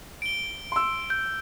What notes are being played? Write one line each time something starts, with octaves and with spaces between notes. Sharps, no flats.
D7 G7
C6 E6
G6